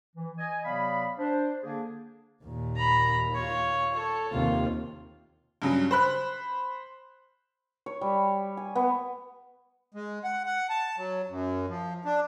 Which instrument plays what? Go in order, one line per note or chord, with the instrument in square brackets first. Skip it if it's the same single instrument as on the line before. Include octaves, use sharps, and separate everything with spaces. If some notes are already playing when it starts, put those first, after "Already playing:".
[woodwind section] E3
D#5 G#5
C3 F#3 B3 D5 F5 B5
D4 C5
D3 A#3 D4 G#4
[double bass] D#2 A#2
[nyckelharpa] A#5 B5
F4 C#5
A4 C#5
[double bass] D#2 C3 [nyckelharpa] F4
[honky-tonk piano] G2 C#3 F#3
C5 B5 F#6
[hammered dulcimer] C#5
G3
G#5
B3
[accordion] G#3
F#5
F#5
A5
F#3
F#2
F3
D4